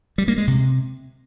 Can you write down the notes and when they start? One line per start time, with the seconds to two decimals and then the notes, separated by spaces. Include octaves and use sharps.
0.18 G3
0.28 A#3
0.38 G#3
0.47 C3